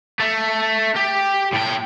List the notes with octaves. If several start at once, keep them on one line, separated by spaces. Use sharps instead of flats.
A3
G4
A2 G5